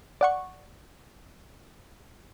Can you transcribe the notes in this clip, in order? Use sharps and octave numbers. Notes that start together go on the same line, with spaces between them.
D5 F#5 C#6